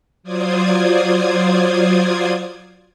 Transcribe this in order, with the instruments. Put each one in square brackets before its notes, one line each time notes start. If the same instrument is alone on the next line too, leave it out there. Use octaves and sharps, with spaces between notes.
[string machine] F#3 F4 C5 D5 D#6 G#6